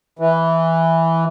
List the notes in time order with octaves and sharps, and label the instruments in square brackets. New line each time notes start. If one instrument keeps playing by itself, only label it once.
[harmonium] E3